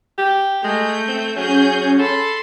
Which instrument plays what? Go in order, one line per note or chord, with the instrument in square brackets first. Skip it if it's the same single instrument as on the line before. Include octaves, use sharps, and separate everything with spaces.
[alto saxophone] G4
[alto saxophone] G#3 [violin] A3 G6
[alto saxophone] C4
[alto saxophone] F#3 [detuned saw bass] C#4 [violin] G#4 G6
[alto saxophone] A4 [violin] B5 C6